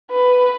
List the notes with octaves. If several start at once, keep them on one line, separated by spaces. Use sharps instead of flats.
B4